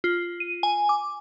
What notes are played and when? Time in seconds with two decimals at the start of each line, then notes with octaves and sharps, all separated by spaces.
0.04 F4
0.40 D#7
0.63 G#5
0.89 D6